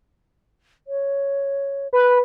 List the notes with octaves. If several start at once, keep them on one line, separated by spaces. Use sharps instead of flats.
C#5
B4